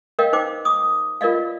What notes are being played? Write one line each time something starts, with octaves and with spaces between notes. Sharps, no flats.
A#4 C#5 D#5 F5 G5
D#4 C5 G5 D6
D6 D#6
F4 A#4 D5 D#5 F5